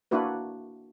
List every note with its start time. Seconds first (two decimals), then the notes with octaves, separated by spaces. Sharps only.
0.11 A#3 D4 E4 F#4 B4